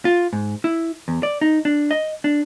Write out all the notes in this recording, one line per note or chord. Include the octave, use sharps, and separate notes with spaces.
F4
G#2
E4
E2
D5
D#4
D4
D#5
D4